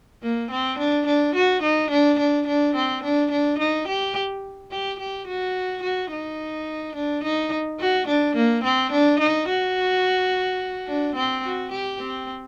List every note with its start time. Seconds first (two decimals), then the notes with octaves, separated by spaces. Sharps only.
0.23 A#3
0.51 C4
0.78 D4
1.07 D4
1.35 F#4
1.62 D#4
1.90 D4
2.19 D4
2.47 D4
2.76 C4
3.04 D4
3.31 D4
3.59 D#4
3.88 G4
4.71 G4
5.00 G4
5.27 F#4
5.83 F#4
6.12 D#4
6.95 D4
7.23 D#4
7.80 F#4
8.08 D4
8.36 A#3
8.64 C4
8.92 D4
9.20 D#4
9.48 F#4
10.88 D4
11.15 C4
11.45 F#4
11.71 G4
12.00 C4